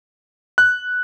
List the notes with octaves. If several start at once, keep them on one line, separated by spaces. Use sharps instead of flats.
F#6